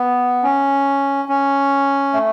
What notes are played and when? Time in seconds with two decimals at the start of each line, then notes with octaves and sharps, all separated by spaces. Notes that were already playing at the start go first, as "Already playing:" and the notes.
Already playing: B3
0.43 C#4
1.29 C#4
2.13 A3